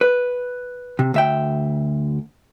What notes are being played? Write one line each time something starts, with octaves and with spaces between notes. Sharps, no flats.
B4
C3
D2 E5 G5